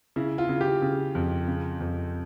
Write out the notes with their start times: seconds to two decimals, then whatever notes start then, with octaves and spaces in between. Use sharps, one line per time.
0.16 C#3 E4
0.38 F4
0.49 C#3
0.61 G4
0.82 C#3
1.15 F2
1.48 C#3
1.81 F2